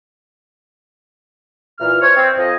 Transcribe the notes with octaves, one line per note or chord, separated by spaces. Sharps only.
A#2 E3 F6
C5 C#5
C4
F2 D#5